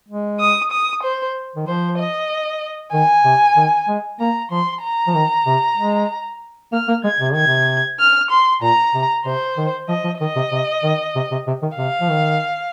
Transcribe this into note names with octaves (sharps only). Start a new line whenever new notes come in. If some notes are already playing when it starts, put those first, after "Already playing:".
G#3
D#6
D#6
C5
D#3
F3 C5
D#5
D#3 G#5
C3
D#3
G#3
A#3 A#5
F3 C6
A#5
F3
D#3
C3
G#3
A#3 F6
A#3
G#3 G#6
C3
D#3 G#6
C3
F6
C6
A#2 A#5
C3
C3 C5
D#3
F3 D#5
F3
D#3 D#5
C3
C3
D#3
C3
C3
C3
D#3
C3 F5
F3
D#3